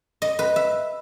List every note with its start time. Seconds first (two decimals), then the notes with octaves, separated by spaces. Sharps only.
0.22 D#5
0.39 B4
0.56 E5